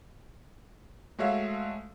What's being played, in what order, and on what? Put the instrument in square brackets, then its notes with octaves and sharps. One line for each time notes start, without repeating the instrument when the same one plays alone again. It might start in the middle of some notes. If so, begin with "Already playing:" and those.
[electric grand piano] G#3 A3 F#4 C#5 E5 F5